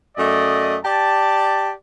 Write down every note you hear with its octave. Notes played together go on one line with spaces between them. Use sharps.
F#2 A3 D5 D#5
G4 D5 A5